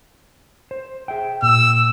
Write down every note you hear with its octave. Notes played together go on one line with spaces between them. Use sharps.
C5
G#4 E5 G5
A#2 E6